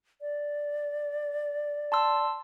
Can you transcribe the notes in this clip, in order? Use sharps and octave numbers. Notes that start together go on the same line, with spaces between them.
D5
A5 C6 E6